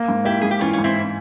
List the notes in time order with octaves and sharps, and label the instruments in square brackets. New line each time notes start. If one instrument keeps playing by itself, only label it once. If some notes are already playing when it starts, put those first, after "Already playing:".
Already playing: [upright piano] A#3
G#2
[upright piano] A#3 [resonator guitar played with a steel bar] E4 G4
[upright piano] G#2 [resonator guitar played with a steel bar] G#4
[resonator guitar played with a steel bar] G4
[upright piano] E3 [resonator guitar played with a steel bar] C#4 F4
[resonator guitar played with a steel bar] C#4
[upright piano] G#2
[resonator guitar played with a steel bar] C4 E4